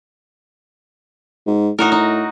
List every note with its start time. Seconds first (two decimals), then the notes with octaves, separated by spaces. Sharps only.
1.47 G#2
1.79 A2 D#4 F#4 A#4
1.92 D#4